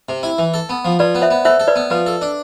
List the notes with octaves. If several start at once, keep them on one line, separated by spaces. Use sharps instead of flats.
C3
E4
E3
A4
B3
F3
F3 B4 D5
B3
C5 E5
B3
A4 C5 E5
A4
B4 D5
B3
F3 B4
A4
D4